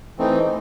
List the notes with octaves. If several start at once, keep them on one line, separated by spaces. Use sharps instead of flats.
E3 A3 C4 D#4